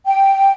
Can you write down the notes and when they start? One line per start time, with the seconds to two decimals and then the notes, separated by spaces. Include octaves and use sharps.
0.07 G5